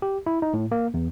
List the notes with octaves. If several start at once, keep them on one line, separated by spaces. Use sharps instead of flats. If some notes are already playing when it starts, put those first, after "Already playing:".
G4
E4
D#4
A2
A#3
E2